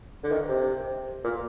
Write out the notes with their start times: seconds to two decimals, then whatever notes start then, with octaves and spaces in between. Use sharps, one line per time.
0.24 D3
0.32 D#3
0.49 C3
1.24 A#2